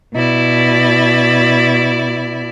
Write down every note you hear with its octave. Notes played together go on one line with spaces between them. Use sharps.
B2 E4 D5